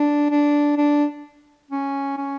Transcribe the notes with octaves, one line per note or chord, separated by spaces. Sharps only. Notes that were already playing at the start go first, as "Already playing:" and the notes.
Already playing: D4
D4
D4
C#4
C#4